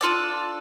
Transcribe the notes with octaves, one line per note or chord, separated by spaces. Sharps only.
D4 F4 A4 D5